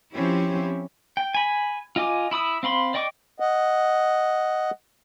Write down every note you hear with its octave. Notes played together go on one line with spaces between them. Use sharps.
F3 C4 C#4 E4 G4
G5
G#5 B5
F4 D#5 G#5 D6
E4 B5 D#6 E6
C4 F5 B5 C6
D5 D#5 G5 C#6 D6
D#5 F#5